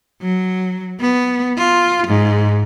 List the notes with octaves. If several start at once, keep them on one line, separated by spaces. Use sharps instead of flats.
F#3
B3
F4
G#2